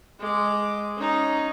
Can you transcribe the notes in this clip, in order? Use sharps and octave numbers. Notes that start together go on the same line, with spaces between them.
G#3 D6
C#4 D#4